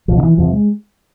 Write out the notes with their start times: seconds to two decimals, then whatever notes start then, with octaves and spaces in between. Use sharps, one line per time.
0.08 C2 B2 F3
0.18 D3
0.23 E3
0.38 E2 C3 F3
0.52 G#3